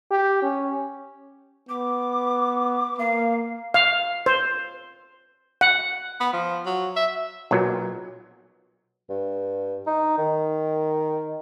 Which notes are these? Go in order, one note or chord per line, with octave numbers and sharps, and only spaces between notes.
G4
C#4
B3 D6
A#3 F5
F5
C5
F#5
B3
F3
F#3
E5
B1 A#2 F#3
G2
D#4
D#3